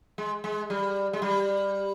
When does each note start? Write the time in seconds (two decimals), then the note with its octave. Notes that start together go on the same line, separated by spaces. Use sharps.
0.18 G#3
0.44 G#3
0.70 G3
1.13 G#3
1.22 G3